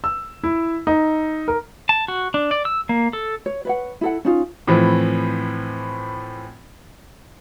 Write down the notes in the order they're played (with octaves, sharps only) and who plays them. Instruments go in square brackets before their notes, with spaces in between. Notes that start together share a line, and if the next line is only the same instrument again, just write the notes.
[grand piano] E6
E4
D#4
A#4
[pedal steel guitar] A5
F#4
D4
D5
E6
A#3
A4
[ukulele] C#5
B4 C#5 F#5
E4 A4 F#5
C#4 D#4 F4
[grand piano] A2 E3 F3 C4